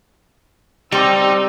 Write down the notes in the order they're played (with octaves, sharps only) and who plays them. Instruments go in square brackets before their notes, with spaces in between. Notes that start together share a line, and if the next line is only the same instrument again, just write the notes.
[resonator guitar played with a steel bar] G3 [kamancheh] C4 E6 [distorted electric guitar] D#4 [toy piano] G5 C6